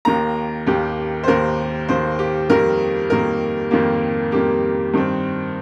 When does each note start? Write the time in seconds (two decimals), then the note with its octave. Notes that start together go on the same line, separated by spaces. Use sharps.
0.05 D#2 D#3 A#3 A#5
0.66 D#2 D#3 A#3 G4
1.24 C5
1.27 D#2 D#3 A#3 A#4
1.88 D#2 D#3 A#3 C5
2.19 G4
2.49 F2 D#3 G3 A#3 A#4
3.10 F2 D#3 G3 A#3 A#4
3.71 F2 D#3 G3 A#3 G4
4.32 F2 D#3 G3 A#3 G4
4.94 G2 D#3 C4